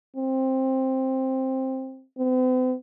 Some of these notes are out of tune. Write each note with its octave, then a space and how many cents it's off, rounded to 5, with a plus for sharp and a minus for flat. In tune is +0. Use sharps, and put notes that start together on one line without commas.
C4 +10
C4 -45